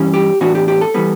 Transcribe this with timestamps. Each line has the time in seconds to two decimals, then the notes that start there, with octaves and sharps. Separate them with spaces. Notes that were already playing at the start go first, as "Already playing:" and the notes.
Already playing: G2 E3 G3 C#4
0.14 G4
0.41 A2 E3 B3 D4 F#4
0.55 G4
0.68 G4
0.81 A4
0.94 E3 G3 B3